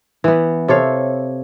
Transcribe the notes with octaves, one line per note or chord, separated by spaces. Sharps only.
E3 B3
C3 A4 C#5 F5